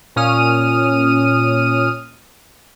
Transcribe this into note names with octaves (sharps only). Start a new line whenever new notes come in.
A#2 C#4 D#6 F6 D#7